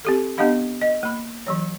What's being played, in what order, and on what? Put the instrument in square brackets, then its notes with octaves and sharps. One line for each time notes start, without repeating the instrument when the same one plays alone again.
[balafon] C4 G4 A4
B3 D4 G4 D#5 F5 B5
D#5
A#3 B5
E3 F#3 C#5